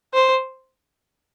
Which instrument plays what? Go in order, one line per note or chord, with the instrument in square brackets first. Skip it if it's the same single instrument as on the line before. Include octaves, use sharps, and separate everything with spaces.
[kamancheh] C5